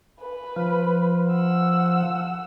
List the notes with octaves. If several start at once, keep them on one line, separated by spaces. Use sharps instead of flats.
B4
F3
F#5 E6